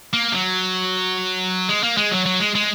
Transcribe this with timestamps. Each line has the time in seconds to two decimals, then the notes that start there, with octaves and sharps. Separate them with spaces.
0.13 A#3
0.32 F#3
1.69 G#3
1.83 A#3
1.97 G#3
2.11 F#3
2.26 F#3
2.40 G#3
2.55 G#3